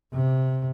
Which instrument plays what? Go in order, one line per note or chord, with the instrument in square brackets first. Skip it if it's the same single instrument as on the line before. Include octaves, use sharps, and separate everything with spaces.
[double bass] C3